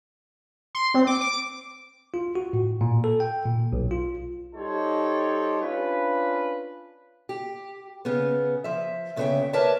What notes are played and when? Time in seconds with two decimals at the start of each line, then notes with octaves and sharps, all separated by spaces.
0.75 C6
0.94 C4
1.07 D6
1.21 D6
2.14 F4
2.35 F#4
2.53 A2
2.81 A#2
3.04 A4
3.20 G5
3.45 A#2
3.73 B1
3.91 F4
4.55 G3 D#4 G4 A4 C5 C#5
5.62 C#4 D4 F4 B4
7.29 G4
8.05 C#3 B3
8.64 F3 E5
9.16 D2 C#3 B3 C5 E5 G5
9.53 A#4 B4 C#5 D5 E5 A5